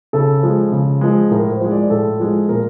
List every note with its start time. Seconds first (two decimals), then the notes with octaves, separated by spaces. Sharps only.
0.13 C#3 A4
0.43 F3 G#3
0.72 C#3
1.01 F3 G#3
1.31 A2 A#4
1.51 C5
1.61 F3 G#3
1.71 D5
1.90 A2 A4
2.20 F3 G#3
2.49 A#2 A#4